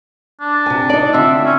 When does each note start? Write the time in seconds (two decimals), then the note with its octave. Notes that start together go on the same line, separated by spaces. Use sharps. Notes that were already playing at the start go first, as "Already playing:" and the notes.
0.41 D4
0.66 C3 G#5
0.90 D#4 D5
1.13 D3 C4 F4 E5
1.45 C#4